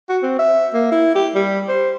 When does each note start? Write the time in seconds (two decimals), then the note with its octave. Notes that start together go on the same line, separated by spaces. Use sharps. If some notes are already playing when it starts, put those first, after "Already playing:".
0.09 F#4
0.23 C4
0.39 E5
0.74 A#3
0.92 E4
1.15 G4
1.35 G3
1.69 C5